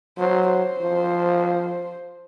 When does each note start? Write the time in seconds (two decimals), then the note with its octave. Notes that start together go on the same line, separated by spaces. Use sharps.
0.18 F#3 C5
0.50 C5
0.81 F3